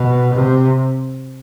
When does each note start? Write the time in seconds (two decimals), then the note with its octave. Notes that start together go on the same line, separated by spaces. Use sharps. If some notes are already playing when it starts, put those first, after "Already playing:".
Already playing: B2
0.34 C3